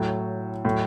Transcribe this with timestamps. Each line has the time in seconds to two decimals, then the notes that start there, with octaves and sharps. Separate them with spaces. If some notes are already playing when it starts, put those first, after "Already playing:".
Already playing: A2 F#3
0.65 A2 F#3